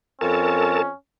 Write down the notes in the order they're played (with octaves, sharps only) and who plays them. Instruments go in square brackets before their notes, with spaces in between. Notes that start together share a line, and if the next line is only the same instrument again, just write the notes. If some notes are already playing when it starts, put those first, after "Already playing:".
[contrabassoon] F2 [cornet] C#4 [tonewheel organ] A4 A#4 A5